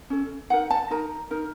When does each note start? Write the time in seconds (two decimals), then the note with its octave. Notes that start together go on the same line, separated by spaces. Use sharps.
0.10 C#4 A4
0.50 D#4 A#4 F#5
0.70 A5
0.90 D#4 A#4 A#5
1.31 D#4 A#4